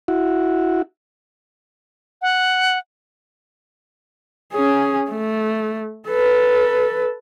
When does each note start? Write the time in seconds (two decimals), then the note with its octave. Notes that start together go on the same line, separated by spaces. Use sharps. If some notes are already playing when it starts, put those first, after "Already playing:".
0.08 E4 F#4
2.22 F#5
4.53 C#4 G#4
5.10 A3
6.08 A4 B4